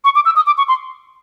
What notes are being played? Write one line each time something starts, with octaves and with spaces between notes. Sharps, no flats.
C#6
D6
E6
D#6
D6
C#6
C6